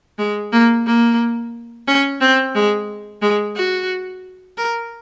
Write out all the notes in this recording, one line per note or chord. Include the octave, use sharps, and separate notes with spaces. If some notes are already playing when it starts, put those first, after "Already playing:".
G#3
A#3
A#3
C#4
C4
G#3
G#3
F#4
A#4